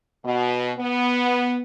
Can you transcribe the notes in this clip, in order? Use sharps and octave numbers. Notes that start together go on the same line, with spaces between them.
B2
B3